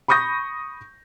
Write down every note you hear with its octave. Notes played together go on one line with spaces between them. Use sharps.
B5 C#6 D#6 G6 A#6